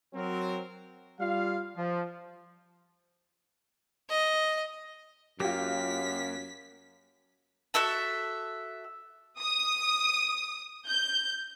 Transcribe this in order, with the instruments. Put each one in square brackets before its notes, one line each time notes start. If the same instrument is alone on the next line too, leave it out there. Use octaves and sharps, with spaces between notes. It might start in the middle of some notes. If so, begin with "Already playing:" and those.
[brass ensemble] F#3 C4 A#4
[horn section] G3 F4 F5
F3
[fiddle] D#5
[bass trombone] F#2 [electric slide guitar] F#3 A#3 [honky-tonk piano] F4 G4 [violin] B6
[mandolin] F#4 A4 E5 A5
[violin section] D#6
G6